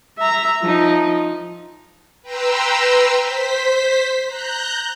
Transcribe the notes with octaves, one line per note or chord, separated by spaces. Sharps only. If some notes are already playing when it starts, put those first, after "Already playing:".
E5 A#5
F3 D#4
B4 G5 A#5 C6 E6
C5 B6
A#5 F#6 G6